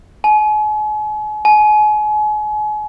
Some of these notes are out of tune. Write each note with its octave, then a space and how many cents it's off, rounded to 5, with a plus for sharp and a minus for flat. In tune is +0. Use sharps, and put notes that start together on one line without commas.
G#5 +40
G#5 +35